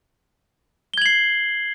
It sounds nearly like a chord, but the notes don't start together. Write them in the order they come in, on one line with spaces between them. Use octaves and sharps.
G7 G#6 F#7 C7